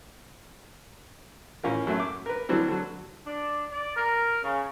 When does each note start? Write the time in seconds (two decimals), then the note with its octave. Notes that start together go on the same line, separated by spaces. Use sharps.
1.63 A1 C#4 F4 A#4
1.87 F#2 F#3 A3
2.00 D6
2.26 A#4 B4
2.49 D3 E3 F#3 G3 C4
2.68 D3 F#3
3.27 D4
3.72 D5
3.97 A#4
4.43 C#3